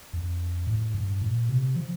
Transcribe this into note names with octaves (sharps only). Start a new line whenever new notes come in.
F2
A2
G2
A#2
C3
F3